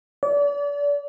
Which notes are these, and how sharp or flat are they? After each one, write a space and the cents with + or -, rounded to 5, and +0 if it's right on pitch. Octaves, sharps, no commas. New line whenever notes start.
D5 -35